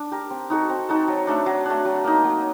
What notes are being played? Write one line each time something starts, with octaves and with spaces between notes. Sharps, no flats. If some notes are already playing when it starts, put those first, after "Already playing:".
Already playing: D4
G4 A#4
C4
D#4 F#4 A4
C4
D#4 F#4 A4
F#3
A3 D4
F#3
A3 D4
F#3
A#3 D#4
F#3